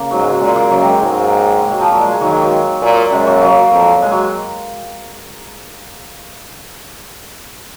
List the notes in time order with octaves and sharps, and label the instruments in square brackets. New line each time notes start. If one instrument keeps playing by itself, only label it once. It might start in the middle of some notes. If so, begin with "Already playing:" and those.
Already playing: [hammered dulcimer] C#3 A#3
[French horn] G#2 [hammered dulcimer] F#3
[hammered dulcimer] G#3
F#3
[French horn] A#2 [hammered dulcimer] G#3
[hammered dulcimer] F#3 A#3
[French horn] F#2 [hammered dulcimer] F#3 A#3
[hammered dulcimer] G#3 C4
[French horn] G#2 [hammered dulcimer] F#3 A#3
[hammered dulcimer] G#3
F#3
F3
[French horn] A#2 [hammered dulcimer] F#3
[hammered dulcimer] G#3
G#3
[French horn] D#3 [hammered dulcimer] F#3 A#3
[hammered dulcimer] G#3
F#3
[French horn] A#2
[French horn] F#2 [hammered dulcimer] G#3
[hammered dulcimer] F#3 A#3
F#3 A#3
[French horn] F2
[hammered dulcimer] G#3
F#3